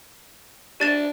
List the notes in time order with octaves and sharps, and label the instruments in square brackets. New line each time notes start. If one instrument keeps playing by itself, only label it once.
[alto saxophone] D4 [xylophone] G4 A6 E7